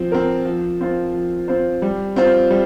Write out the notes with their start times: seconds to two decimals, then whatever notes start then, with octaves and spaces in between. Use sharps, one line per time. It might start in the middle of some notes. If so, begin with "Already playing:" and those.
Already playing: F3 C4
0.12 C4 A#4
0.45 F3
0.80 C4 F4 C5
1.14 F3
1.48 C4 F4 C5
1.82 G3
2.16 C4 F4 C5
2.50 G3